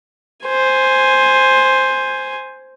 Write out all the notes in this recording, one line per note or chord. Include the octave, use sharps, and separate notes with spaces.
C5 G#5